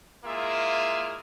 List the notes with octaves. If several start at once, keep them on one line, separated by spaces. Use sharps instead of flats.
G#3 A#3 E4 F4 G#4 E5